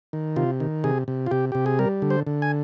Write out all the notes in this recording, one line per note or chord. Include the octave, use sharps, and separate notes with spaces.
D#3
C3 F4
D#3
C3 G#4
C3
F4
C3 G4
C3 G4
G#4
G3 A#4
D3
C5
D3
G#5